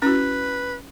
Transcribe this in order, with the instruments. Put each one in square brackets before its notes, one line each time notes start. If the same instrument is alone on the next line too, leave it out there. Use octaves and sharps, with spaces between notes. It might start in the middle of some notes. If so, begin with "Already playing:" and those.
[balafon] C#4 E4 F#4 [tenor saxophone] B4